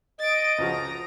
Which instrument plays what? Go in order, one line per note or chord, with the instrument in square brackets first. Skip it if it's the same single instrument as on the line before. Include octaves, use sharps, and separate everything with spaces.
[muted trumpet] D#5 [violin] A6 D7
[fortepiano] C#2 F3 F#4 [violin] A#5